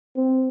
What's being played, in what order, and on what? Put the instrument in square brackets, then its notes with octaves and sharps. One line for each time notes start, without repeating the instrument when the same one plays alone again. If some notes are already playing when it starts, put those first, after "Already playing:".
[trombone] C4